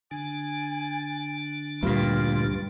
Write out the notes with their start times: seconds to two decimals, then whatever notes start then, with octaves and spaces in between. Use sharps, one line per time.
0.11 D3 D4 G#5
1.83 D2 G2 A#2 F4